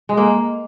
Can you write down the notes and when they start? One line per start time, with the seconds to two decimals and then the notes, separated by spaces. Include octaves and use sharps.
0.09 G#3
0.17 A#3